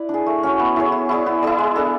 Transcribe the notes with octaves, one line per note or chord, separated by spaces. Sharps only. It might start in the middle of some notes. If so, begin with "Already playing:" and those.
Already playing: E4 B4 D5
D4 G#4
A3
C#4 F#4 C#5
B3
E4 G#4 C#5
B3
E4 G#4 D5
B3
E4 G#4 D5
G#3
B3 D4 A4